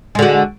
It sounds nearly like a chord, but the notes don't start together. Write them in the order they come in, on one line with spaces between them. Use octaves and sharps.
G#3 D3 F#4